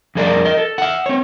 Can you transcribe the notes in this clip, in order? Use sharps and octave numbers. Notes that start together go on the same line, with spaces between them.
F2 G3 G#4 A#4 D5
A#4 D#5
A4
E5 F#5
C4 C#5